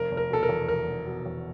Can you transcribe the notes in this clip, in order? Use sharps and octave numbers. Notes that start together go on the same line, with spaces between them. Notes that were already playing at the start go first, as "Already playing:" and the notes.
Already playing: F1 A#4
F1
A#4
B2 A4
A#4
E2
F1 A#4
F1
B2
E2